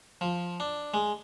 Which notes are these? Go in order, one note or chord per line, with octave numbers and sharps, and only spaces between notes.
F3
D4
G#3